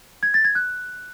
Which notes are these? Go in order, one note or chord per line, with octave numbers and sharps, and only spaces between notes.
G#6
A6
G#6
F#6